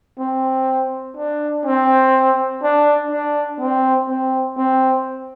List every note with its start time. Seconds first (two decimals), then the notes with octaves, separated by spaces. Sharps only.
0.19 C4
1.17 D4
1.65 C4
2.63 D4
3.11 D4
3.60 C4
4.08 C4
4.57 C4